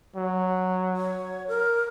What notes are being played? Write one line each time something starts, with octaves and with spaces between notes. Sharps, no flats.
F#3
C#5
A#4